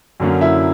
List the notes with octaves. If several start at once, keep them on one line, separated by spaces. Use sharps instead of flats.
F#2 D3 F#3 A#3 C#4
E4 E5